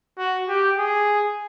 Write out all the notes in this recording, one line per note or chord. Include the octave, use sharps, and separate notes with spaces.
F#4
G4
G#4